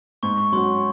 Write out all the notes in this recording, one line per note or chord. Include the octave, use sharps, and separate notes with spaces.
G#2 C#6
C#6
F#3 C#4 F#4 C6